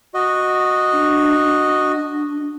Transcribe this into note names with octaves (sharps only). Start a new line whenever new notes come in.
F#4 D#5
D4
D4